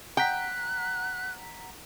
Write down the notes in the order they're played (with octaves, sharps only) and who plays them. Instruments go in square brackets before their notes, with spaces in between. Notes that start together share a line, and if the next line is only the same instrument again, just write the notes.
[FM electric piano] F#5 A#5 B6 [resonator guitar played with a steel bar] G5 [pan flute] F#6